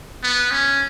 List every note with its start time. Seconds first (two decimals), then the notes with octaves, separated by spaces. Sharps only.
0.23 B3
0.52 C#4